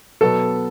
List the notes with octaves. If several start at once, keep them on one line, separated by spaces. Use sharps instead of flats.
B2 F#3 B3 A4